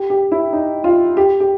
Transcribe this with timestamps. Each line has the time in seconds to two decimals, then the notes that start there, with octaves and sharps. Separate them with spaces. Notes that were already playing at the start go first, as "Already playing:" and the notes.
Already playing: G4
0.10 G4
0.32 E4
0.53 D#4
0.84 F4
1.17 G4
1.40 G4